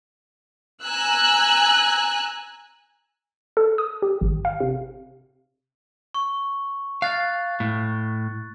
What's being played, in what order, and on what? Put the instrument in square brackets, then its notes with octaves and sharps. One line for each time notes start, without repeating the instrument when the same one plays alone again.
[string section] G#5 A#5 E6 F#6
[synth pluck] A4
D#6
G4
G#1
F5
C3
[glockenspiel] C#6
[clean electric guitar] F5 [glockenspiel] F#6 A6
[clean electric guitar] A2